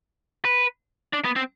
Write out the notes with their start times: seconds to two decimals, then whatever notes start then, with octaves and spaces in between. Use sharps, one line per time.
0.45 B4
1.13 D4
1.25 B3
1.36 C4